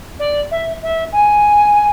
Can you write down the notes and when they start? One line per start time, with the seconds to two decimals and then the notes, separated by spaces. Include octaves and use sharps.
0.19 D5
0.51 E5
0.83 E5
1.12 G#5